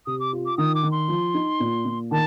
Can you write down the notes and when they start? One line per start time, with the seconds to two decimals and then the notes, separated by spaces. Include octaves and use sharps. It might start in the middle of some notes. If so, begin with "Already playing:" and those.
0.06 C3 D#6
0.20 D6
0.33 F4
0.46 D6
0.57 D#3 D#6
0.75 D6
0.83 D#3
0.91 C6
1.08 F3
1.34 D#4
1.60 A#2
1.85 A#2
2.11 D#3 A5